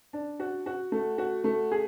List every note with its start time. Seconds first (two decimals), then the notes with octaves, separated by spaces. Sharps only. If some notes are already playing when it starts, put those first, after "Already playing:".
0.13 D4
0.40 F#4
0.66 F#4
0.92 A3
1.18 F#4
1.44 A3
1.71 G#4